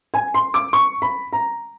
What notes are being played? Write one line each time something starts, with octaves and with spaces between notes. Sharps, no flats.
G#5
C6
D6
C#6
B5
A#5